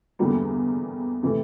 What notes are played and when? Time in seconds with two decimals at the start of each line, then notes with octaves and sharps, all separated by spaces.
0.19 E2 D3 G3 A#3
1.23 C3 E3 A3